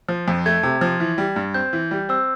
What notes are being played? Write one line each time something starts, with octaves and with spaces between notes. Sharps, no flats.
F3
F2
A3 G#6
C3
F3
E3
G3
G2
C4 G6
E3
G3
C4 E6